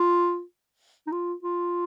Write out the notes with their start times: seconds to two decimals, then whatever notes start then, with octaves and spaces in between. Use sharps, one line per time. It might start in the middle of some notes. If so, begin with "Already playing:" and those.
Already playing: F4
1.07 D#4
1.12 F4
1.43 F4